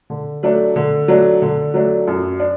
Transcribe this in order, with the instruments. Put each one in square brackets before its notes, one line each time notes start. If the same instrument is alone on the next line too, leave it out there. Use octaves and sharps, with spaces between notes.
[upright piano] D3
F#3 A3 D4
D3
F#3 A3 D4
D3
F#3 A3 D4
F#2
D4